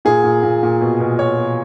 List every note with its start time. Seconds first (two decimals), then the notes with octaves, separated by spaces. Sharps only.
0.05 A#2 G#4
0.24 A#2
0.43 A#2
0.63 A#2
0.81 B2
1.00 B2
1.19 B2 C#5
1.38 B2